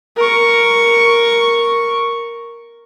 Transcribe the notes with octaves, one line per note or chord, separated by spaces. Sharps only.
A#4 C#6